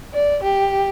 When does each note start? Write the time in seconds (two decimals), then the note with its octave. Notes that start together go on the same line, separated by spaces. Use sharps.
0.13 D5
0.44 G4